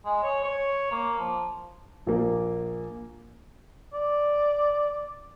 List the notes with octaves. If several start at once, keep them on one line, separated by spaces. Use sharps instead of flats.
G#3
C#5
C#5
A#3
F3
A#1 A#3
D5